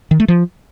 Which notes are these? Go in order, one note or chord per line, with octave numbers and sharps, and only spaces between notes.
D#3
A3
F3